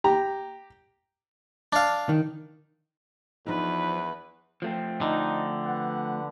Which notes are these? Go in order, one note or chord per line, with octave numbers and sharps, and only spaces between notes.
G4 A#5
D4 F5
D#3
E2 F3 D4 D#4 B4
F3 A3 C4
D3 D#4
B4 F#5